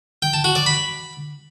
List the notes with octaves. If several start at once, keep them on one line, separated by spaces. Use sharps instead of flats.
G5
A5
F#4
D5
B5